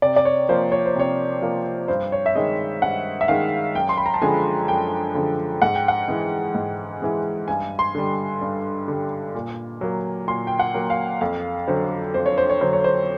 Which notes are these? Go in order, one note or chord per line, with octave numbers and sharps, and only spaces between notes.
C3 D5
D5
C#5
F3 A#3 C5
C#5
C5
C3 C#5
F3 A#3
G2 C5
C#5
E5
D#3 G#3 D#5
G2 F#5
E5
D#3 G#3 F5
F#2 G5
C6
B5
A#5
A5
D3 F3 G#3 G#5
F#2 G5
D3 F3 G#3
G#2 F#5
G5
F#5
E3 G#3
G#2
E3 G#3
G2 G#5
C6
D3 G3
G2
D3 G3
A#2
F#3 A#3
A#2 C6
G5
F#5
F#3 A#3
F5
F2 F5
D3 F#3 C5
F2 C5
C#5
C5
C#5
D3 F#3 C5
C#5
C5